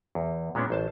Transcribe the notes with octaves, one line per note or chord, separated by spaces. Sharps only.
E2
A#2 G#3 B3 C#4 D4
A1 C5 A5